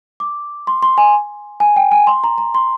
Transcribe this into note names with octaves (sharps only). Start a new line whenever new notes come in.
D6
C6
C6
G#5
G#5
G5
G#5
C6
A#5
A#5
C6